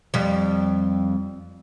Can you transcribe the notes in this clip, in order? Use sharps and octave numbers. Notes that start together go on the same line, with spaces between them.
F2 G3